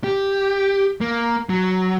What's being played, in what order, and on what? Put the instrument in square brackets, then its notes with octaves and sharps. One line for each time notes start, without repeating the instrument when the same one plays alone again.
[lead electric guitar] G4
A#3
F#3